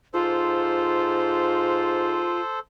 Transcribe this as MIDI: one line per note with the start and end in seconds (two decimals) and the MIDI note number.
0.14 2.34 44
0.14 2.41 65
0.14 2.59 69
0.14 2.59 72